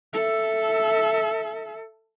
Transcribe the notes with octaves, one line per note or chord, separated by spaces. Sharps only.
A4 E5